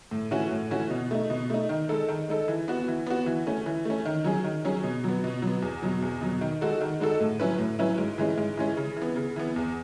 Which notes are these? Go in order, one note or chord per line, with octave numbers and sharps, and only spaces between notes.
A2
E3 A3 C#4 F#4
A2
E3 A3 C#4 F#4
B2
A3 D#4
B2
A3 D#4
D#3
G#3 D#4 A4
D#3
G#3 D#4 A4
E3
B3 F#4
E3
B3 F#4
E3
A3 C#4
E3
A3 C#4
D#3
F#3 C#4 G#4
D#3
F#3 C#4 G#4
B2
F#3 B3
B2
F#3
B3
E2
B2 F#3
E2
B2 F#3
D#3
G#3 D#4 F#4 A4
D#3
G#3 D#4 F#4 A4
A2
F#3 C#4 E4 B4
A2
F#3 C#4 E4 B4
G#2
E3 G#3 C#4
G#2
E3 G#3 C#4
C#3
E3
B3
C#3
E3 B3
E2